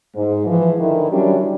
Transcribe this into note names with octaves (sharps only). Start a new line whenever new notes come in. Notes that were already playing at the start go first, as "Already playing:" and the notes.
G#2
E3 F3
D3 D#3 E4
F#3 G3 C#4 D4 E4